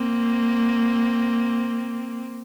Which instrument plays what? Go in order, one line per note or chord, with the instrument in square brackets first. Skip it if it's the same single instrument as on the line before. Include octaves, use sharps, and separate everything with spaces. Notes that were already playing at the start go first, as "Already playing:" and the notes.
Already playing: [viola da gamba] A#3 C4